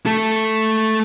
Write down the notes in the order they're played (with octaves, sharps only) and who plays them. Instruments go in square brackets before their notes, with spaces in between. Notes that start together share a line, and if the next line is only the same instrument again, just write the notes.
[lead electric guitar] A3 A4